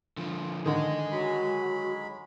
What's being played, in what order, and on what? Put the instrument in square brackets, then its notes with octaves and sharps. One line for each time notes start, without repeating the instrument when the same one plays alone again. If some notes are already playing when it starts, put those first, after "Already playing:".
[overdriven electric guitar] D3 F3
[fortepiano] D3 D#3 [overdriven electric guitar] G#4 D#5
[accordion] F#3 G#3 B5 [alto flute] F#4